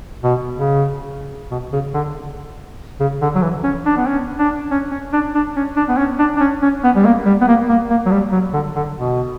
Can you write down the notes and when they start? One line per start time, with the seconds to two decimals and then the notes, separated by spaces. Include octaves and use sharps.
0.24 B2
0.56 C#3
1.51 B2
1.72 C#3
1.94 D3
3.00 C#3
3.21 D3
3.35 F#3
3.42 E3
3.63 C#4
3.86 D4
3.97 B3
4.07 C#4
4.39 D4
4.71 C#4
4.91 C#4
5.13 D4
5.35 D4
5.56 C#4
5.77 D4
5.89 B3
5.98 C#4
6.19 D4
6.37 D4
6.40 C#4
6.62 C#4
6.84 B3
6.96 G3
7.05 A#3
7.26 G3
7.41 B3
7.48 A#3
7.69 A#3
7.90 A#3
8.06 F#3
8.11 G3
8.32 F#3
8.53 D3
8.76 D3
8.96 B2